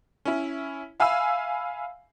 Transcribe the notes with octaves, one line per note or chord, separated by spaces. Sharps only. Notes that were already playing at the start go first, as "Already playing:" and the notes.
C#4 E4
E5 F5 G#5 B5 E6